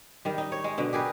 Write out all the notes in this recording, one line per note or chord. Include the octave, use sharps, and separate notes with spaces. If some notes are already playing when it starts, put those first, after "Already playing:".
D#3 G3
D#4
C#5
G#3
B2 D3
G4 G#4 A#4 B4